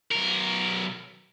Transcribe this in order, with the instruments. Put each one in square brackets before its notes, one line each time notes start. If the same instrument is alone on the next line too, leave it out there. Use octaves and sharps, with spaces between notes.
[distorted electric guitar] B1 A#4